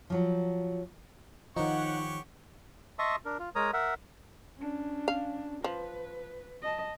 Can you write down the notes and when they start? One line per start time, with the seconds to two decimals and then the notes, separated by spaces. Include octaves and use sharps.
0.10 F3 F#3
1.56 D#3 F3 D#4 G4 C#5 F#5 C#6
2.99 D#5 E5 A5 C6 C#6 D#6
3.25 D4 A#4
3.39 F4
3.55 G#3 A#4 C#5 A#5 D#6
3.73 A#4 E5 F#5
4.58 C#4 D4
5.08 F5
5.64 F3 B4
6.62 D#5 A5